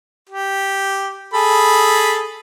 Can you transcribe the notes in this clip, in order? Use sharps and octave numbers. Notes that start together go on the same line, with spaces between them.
G4
G#4 A4 B5